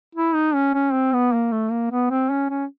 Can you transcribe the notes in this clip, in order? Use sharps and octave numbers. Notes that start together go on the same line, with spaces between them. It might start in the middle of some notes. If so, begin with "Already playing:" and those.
E4
D#4
C#4
C#4
C4
B3
A#3
A3
A#3
B3
C4
C#4
C#4